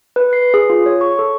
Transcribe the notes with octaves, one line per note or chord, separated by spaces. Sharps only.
B4
C7
G#4
F4
C#5
C#6
A4